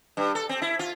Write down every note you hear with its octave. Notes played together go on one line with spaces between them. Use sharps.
G2
A4
C4
E4
F4